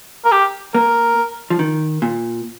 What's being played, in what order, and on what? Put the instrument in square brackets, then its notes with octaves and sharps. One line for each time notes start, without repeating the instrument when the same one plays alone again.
[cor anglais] A#4
G4
[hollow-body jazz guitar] A#3 [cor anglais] A#4
[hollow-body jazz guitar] F3
D#3
A#2